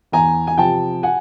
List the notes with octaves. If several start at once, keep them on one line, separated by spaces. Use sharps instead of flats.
E2 G#5 A#5
G#5
C3 F3 G5 A5
F#5 G#5